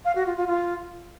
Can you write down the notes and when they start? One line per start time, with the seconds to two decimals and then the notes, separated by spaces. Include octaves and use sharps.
0.05 F5
0.15 F#4
0.26 F4
0.36 F4
0.47 F4